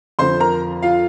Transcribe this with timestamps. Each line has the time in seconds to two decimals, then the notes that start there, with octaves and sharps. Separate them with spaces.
0.19 F2 D3 F3 C5 C6
0.40 A#4 A#5
0.82 F4 F5